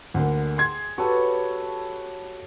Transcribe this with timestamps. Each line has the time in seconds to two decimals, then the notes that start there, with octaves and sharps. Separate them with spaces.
0.14 D2 D3 A#3
0.58 G#4 C6 G#6
0.98 F#4 G4 A4 B4 C#5